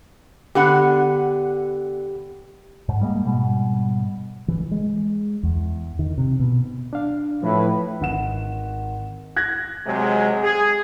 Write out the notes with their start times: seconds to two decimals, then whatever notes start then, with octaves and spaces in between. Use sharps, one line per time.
0.55 D3 B3 G4 F#5
2.89 G#2
3.01 G3 G#3 A#3
3.25 G#2 B2 G3
4.48 E3
4.71 G#3
5.43 E2
5.99 D#3
6.18 C3
6.39 B2
6.93 D4 F5
7.43 A2 F3 E4 B4
8.01 G#1 F#5 E7
9.36 F#6 G#6 A#6
9.87 C3 F#3 G#3
10.44 G#4